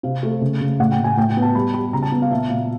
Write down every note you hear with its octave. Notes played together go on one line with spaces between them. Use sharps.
C3 F5
A3
C#3
C#3
A2 F#5
G5
A2
G#5
A2 G5
G5
B3
A5
G3 B5
G3 B5
C#3 A#5
A5
B3
F5
A#2 E5
A#2 F5